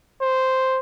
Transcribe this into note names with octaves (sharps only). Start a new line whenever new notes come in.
C5